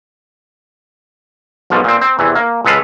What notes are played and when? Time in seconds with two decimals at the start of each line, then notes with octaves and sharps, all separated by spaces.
1.70 B1 G#2 B2 F3
1.84 A#2 C4
2.01 C4
2.19 E2 C3 E3
2.35 A#3
2.65 C#2 G#3 A4 B4 F5